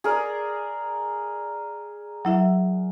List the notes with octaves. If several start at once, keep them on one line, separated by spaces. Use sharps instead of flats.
G#4 A#4 D5
F#3 E4 E5